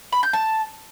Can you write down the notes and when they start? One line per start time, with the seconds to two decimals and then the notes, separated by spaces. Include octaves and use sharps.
0.13 B5
0.23 G6
0.33 A5